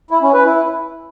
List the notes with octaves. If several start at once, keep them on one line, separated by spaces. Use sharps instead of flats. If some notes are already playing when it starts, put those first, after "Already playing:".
E4
C#4
B4
E4